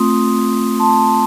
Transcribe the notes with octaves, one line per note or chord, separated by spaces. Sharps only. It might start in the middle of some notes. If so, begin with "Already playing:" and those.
Already playing: A3 C4 F4 C6 D#6
A5 C6